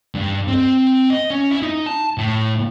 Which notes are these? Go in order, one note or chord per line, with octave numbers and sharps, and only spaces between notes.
G2
C4
D#5
C#4
E4
D#4
A5
A2